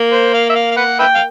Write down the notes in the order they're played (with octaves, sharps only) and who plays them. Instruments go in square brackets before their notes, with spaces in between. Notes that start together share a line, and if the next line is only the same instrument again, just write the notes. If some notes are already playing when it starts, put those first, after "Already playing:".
Already playing: [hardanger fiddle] A#3
[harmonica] C5
F5
E5
F5
F5
B4 F#5
B4 E5 G5
F5